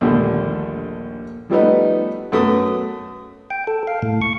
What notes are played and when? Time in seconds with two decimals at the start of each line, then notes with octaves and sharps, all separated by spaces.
0.01 A#1 D#2 D3 G3 A3
1.50 F3 G3 A3 B3 D#4
2.32 F#2 A3 B3 D#6
3.50 G5
3.67 A4
3.87 F5
4.02 A2
4.22 C#6